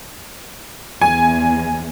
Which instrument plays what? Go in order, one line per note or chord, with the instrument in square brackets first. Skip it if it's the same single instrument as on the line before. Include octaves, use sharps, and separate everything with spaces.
[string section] E2 [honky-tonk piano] G#5